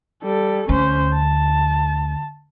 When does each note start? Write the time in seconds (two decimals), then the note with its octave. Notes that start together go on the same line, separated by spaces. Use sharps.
0.23 G3 A4
0.69 D2 C#4 C5
1.14 A5